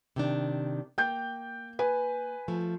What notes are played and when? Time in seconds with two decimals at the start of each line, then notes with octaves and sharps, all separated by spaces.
0.16 C3 D#3 D4
0.98 A#3 G5 G6
1.79 B4 G#5
2.48 F3 A3